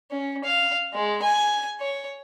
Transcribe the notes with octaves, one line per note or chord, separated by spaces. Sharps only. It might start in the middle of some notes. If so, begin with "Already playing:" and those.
C#4
F5
G#3
G#5
C#5